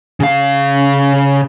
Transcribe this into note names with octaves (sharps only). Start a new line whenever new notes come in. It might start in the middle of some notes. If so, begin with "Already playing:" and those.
C#3 F5